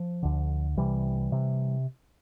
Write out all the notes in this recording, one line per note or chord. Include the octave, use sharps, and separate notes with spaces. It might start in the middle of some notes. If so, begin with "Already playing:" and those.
Already playing: F3
D2 D3
C2 C3 E3 G3
C3